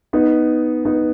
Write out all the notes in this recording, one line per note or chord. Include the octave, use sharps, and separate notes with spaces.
B3 D#4
B3 D#4